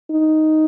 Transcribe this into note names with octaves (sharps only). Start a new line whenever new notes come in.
D#4